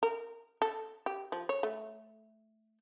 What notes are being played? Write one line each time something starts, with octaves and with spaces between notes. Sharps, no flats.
A#4
A4
G4
F3
C#5
A3